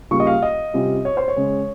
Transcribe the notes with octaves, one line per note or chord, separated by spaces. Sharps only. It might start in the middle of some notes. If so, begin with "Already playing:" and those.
C#3 G3 A#3 F4 C#6
D#5
F5
D#5
C3 G3 C#4 F4
C#5
C5
C#5
C#3 G#3 C#4